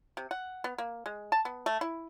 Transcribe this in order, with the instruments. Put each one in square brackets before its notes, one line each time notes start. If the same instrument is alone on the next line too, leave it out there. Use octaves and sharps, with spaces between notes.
[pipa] C3
F#5
B3
A#3
G#3
A5
B3
A3
E4